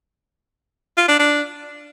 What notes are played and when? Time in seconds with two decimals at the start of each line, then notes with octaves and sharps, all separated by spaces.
0.97 F4
1.08 D4
1.19 D4